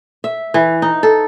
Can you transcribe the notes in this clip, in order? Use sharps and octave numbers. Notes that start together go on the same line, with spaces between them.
E5
E3
D#4
A4